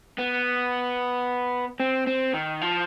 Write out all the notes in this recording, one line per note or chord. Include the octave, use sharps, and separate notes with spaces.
B3
C4
C4
D#3
F3